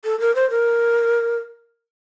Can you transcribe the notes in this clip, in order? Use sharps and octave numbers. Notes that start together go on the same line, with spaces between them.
A4
A#4
C5
A#4